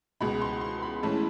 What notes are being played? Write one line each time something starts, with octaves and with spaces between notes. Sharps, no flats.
C#2 B2 G#3 B5
C6
C6
B5
A2 E3 G#3 C#4 E4 A5